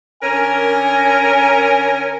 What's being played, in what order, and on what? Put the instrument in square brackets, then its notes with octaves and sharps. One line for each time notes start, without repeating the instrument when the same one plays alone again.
[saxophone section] D3 C#4 A#4 [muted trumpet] G#5